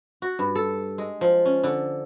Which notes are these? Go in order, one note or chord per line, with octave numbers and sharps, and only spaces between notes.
F#4
G2
A4
G#3
F3
C#4
D3